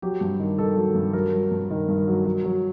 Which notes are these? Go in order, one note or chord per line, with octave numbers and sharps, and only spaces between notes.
F#3 G4
G2
D#3
D#3 A4
F#3
G2
F#3 A#4
F#3
G2
D#3
G2
F#3
F#3
F#3